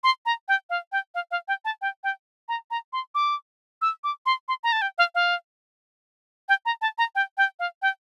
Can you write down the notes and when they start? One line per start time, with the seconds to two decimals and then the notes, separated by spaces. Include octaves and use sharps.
0.04 C6
0.26 A#5
0.48 G5
0.70 F5
0.92 G5
1.15 F5
1.31 F5
1.48 G5
1.65 A5
1.82 G5
2.04 G5
2.49 A#5
2.71 A#5
2.93 C6
3.15 D6
3.82 E6
4.04 D6
4.26 C6
4.48 C6
4.64 A#5
4.72 A5
4.82 G5
4.98 F5
5.15 F5
6.49 G5
6.65 A#5
6.82 A5
6.98 A#5
7.15 G5
7.37 G5
7.59 F5
7.82 G5